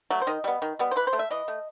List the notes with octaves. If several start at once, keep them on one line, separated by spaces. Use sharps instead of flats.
F#3 A3
C5
D#3 D#5
G3 B3
D#3
G3 B3
C5
E3 B4
C5
A3
E5
E3 D#5
A3